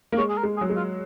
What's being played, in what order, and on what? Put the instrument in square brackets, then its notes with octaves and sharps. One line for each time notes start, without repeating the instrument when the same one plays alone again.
[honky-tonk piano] A#3
[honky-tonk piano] G#3 [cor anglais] C#5
[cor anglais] G#4
A#4
[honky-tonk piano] G#3
[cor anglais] G#4
[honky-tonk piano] F#3
G#3
[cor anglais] F4